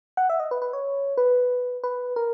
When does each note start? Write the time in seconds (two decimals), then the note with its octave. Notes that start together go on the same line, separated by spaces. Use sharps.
0.17 F#5
0.30 E5
0.40 D#5
0.51 B4
0.62 B4
0.73 C#5
1.17 B4
1.84 B4
2.16 A#4